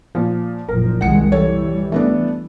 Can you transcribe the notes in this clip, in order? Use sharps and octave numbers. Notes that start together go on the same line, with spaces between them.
A#2 F3
F#1 A#2 F3 A#4
C2 D#3 G#3 F#5 C#7
E3 G3 A4 C#5
A3 B3 D4